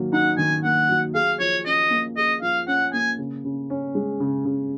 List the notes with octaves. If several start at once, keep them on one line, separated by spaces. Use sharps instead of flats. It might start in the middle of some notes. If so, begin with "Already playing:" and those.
Already playing: D#3 F#3 A#3
D#4 F#5
D#3 G#5
A#3 F#5
F#3
G#4 F5
F3 C#5
C#4 D#5
A#3
G#4 D#5
F3 F5
C#4 F#5
A#3 G#5
C#3
C#3
C#4
G#3
C#3
C#3